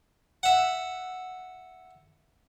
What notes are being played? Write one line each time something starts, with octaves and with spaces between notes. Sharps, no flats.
E5 F#5